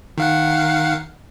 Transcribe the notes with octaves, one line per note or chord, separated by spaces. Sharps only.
D#3 F5 F#5